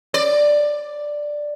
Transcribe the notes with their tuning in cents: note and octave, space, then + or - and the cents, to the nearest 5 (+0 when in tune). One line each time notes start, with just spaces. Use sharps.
D5 +5